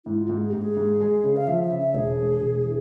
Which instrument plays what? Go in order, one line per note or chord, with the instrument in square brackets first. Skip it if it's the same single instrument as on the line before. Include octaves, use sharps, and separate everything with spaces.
[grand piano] G#2 [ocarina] E4
[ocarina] F4
[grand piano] G#2
[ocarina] G#4
[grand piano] G#2 [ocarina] G4
[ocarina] G#4
[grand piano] G#2
G#3
C#3
[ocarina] F5
[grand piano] F3 [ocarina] E5
[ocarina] E5
[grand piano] C#3
[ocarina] E5
[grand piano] E1 [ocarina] G#4
[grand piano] G#3
E1
E3